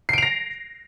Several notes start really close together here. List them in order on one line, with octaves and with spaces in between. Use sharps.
C7 D7 F7 A#6